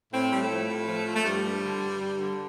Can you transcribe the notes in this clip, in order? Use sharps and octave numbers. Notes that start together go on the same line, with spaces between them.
A2 C4
A2 G3
A3
F3
A2
F3
F3
A3
G2 G3
G2
D3
G2
G2
D3